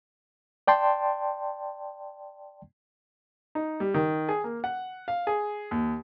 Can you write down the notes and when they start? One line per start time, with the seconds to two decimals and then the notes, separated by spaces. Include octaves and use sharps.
0.68 D5 G5 A5 C6
3.55 D#4
3.80 G3
3.94 D#3
4.29 G#4
4.44 A#3
4.64 F#5
5.08 F5
5.27 G#4
5.71 D#2